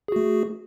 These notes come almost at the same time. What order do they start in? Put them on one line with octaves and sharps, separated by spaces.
G#4 F#4 A3